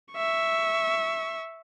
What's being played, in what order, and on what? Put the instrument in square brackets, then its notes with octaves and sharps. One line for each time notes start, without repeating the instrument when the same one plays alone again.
[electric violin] E5 C#6